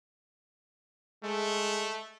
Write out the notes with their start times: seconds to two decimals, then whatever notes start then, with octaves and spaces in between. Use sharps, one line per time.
1.24 G#3 A3